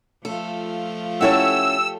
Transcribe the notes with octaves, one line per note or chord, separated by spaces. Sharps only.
F3 A3 F4 A4
C#4 E4 G4 A4 C#5 F#5 E6